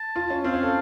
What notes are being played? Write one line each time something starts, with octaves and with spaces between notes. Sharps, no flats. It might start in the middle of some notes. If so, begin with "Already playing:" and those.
Already playing: A5
F4
C#4
C4 F5
C#4
A4